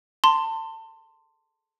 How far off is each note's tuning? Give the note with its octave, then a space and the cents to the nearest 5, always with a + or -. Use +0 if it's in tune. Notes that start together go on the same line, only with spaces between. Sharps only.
A5 +30 C6 +0